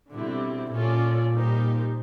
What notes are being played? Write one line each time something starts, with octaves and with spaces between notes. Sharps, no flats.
B2 D3 G3 C4 E4
A#2 C#4 F4 A4 D5
G3 A#3 D#4 G4 C5